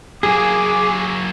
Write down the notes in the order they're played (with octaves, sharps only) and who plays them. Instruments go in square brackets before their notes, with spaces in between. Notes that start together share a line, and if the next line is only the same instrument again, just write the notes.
[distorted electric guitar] F#3 A#3 [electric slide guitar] G#4 [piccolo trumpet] D6